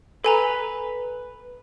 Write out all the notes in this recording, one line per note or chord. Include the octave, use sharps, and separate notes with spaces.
A4 B4 G#5 A#5